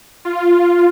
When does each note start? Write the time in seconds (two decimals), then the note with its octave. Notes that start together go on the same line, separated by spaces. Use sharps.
0.25 F4